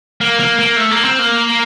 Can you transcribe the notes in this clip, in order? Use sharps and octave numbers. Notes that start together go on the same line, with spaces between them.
A#3
A#3
A#3
A3
A#3
C4
A#3